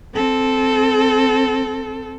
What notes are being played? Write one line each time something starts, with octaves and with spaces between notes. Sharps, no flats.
C4 A4